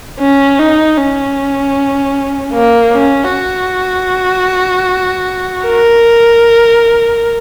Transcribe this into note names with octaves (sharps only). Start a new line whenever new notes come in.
C#4
D#4
C#4
A#3
C#4
F#4
A#4